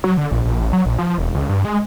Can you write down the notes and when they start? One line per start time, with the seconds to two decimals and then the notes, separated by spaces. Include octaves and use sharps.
0.04 F#3
0.17 D3
0.31 A#1
0.45 A#1
0.60 A1
0.73 F#3
0.86 A#1
0.98 F3
1.18 E1
1.35 C#2
1.49 G2
1.65 G#3